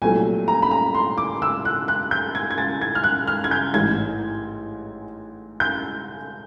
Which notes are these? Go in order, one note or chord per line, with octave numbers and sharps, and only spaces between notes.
C2 A#2 F#3 A3 G#5
A#5
B5
A#5
C6
D6
E6
F#6
F#6
G6
G#6
G#6
A6
G#6
F6
F#6
F6
G#6
G6
A1 G#2 E3 G#6
G6